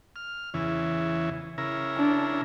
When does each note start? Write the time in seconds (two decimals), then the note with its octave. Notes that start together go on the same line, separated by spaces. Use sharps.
0.16 F6
0.54 E2 C#3 E3
1.58 C#3 E4 A#4
1.97 D4